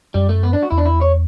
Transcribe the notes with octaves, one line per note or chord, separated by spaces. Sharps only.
F#2 G3
A3
B3
D4
F#4
E2 E4
D4
E4
C#5